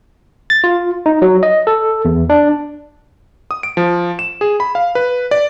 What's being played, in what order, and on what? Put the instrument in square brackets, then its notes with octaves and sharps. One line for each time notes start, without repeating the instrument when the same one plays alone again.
[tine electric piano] A6
F4
D#4
F#3
D#5
A4
E2
D4
[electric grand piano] D#6
D7
F3
E7
G#4
B5
F5
B4
D5